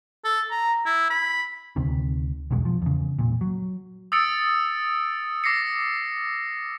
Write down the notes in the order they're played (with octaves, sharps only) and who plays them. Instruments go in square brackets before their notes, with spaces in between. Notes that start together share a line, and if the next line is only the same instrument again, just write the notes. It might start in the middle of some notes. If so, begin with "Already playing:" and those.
[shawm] A4
A#5
E4
B5
[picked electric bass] D2 C3 D#3
B1 E2 B2 G#3
F3
E2 C#3
E1 C2 A#2
F#3
[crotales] D#6 E6 A6 C#7 D7
D6 A#6 C7 C#7